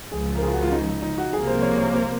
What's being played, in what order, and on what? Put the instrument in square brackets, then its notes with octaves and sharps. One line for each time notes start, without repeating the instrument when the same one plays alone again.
[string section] C#2 C#3 F3 [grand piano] G#4
[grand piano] A#4
G#4
F4
F#4
F4
D#4
D#4
F#4
[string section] C2 C3 F3 A#3 [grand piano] G#4
[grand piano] C5
C#5
C#5
C5